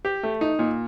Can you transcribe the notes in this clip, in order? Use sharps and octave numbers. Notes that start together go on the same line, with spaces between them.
G4
A3
D#4
A#2